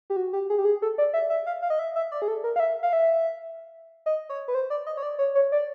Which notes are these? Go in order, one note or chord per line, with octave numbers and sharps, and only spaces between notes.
G4
F#4
G4
G#4
G4
G#4
A4
D5
E5
E5
F5
F5
D#5
E5
E5
D5
G#4
A4
A#4
F5
E5
F5
E5
D#5
C#5
B4
C5
D5
D#5
C#5
D5
C#5
C#5
D5